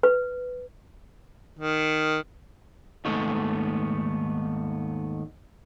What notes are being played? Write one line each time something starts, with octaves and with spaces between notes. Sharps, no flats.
B4
D#3
D#2 G#2 A3 B3